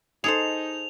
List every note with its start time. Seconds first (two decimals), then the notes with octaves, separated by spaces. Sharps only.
0.24 D#4 G#4 A4 C5 F7